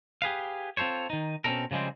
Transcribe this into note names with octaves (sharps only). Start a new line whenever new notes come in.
G4 G#4 B4 F5
C4 F4 A4 C5 C#5
D#3 D#4
B2 C4 C#4 D#4 A4 A#4
C#3 F3 G3 G#3 C4